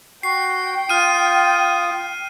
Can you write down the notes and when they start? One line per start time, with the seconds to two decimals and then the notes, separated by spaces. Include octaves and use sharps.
0.23 F#4 G5 C7
0.89 F4 D#6 F6 D#7